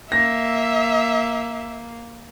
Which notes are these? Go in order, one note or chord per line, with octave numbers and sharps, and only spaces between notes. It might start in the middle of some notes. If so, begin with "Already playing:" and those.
A#3 E5 A#6